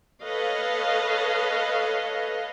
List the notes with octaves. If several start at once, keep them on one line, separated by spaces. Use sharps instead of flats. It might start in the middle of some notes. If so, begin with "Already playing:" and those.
A4 B4 C#5 D#5 F5